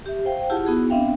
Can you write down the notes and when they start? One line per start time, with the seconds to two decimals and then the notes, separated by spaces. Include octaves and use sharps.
0.06 G4 E5
0.25 C5 F5 G5
0.50 E4 F4 G4 G#4 F#5 A5
0.66 B3 D#4 E4 F#4 G#4
0.90 B3 C4 D4 E5 F5 G5